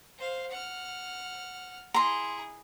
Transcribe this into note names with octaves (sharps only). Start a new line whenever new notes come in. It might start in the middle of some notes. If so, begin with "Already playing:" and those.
C5 F5
F#5 F6
E4 G#4 A#5 C6